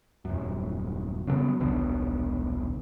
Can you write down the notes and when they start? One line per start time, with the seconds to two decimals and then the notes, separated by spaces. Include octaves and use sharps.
0.25 D#1 F#2
1.27 C#3 F#3 A3 B3
1.60 D#1 B1 B2 D3